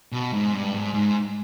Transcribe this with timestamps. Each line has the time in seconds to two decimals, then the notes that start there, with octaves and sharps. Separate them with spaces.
0.12 B2
0.33 G#2
0.53 G2
0.73 G#2
0.94 G#2